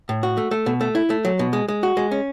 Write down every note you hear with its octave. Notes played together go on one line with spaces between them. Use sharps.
A2
F#4
A3
A3
B2
A3
E4
A3
F#3
B2
G#3
G#3
F#4
G#3
C#4